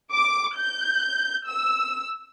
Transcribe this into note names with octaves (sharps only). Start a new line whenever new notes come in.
D6
G6
E6